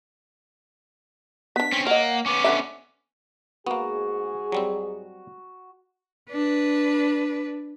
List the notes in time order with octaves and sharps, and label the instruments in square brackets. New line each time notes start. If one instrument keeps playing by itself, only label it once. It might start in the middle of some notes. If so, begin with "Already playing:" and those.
[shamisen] B3 D4 [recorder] B6
[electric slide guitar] C4 C#4
[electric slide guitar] A#3 [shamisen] C#5 D#5 [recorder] F#5
[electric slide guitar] B3 C#4 [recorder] D6
[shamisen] D3 B4 E5
[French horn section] G#2 G#4 [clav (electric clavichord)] A#3 B3 [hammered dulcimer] F#4
[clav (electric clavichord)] F#3 G3 C4
[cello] D4 B4